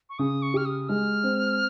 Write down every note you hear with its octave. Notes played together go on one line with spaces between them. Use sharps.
C#6
C#3 D#6
C#6
G4 F6
D#6
G#3 F6
C4